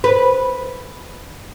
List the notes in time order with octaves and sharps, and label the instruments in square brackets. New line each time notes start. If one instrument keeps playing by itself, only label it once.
[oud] B4